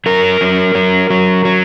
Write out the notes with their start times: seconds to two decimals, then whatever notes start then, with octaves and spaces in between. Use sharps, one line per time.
0.06 F#3 A#4
0.41 F#3
0.75 F#3
1.10 F#3
1.45 F#3